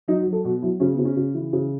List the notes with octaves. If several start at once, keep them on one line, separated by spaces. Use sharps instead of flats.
F#3 D#4
F#4
F#3
A4
B2 F#4
F#3 E4
C#3 C#4
B3
C#3
C#4
C#3
E3
C#3